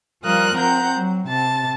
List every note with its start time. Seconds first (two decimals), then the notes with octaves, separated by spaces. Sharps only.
0.24 F3 G3 A#4 F5 D#6 F#6
0.56 C4 F#5 A#5 G6
0.95 F#3
1.28 C3 A5 A6